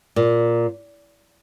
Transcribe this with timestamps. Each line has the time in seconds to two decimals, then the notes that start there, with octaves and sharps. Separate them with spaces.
0.16 A#2